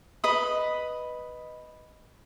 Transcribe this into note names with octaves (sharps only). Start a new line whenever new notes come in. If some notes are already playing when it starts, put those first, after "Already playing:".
B4 D#5 B5 D#6